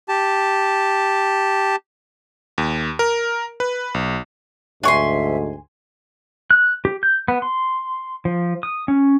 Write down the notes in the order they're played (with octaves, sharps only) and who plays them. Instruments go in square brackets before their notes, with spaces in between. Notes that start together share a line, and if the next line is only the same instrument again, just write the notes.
[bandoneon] G4 A5
[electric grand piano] D#2
A#4
B4
B1
[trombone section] D2 G#2 [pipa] D4 C#6 [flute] E5 [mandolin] G#5 C6
[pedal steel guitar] F#6
G4
G6
B3
C6
F3
D#6
C#4